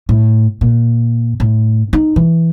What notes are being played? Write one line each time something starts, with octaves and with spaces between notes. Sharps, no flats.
A2
A#2
A2
D#4
E3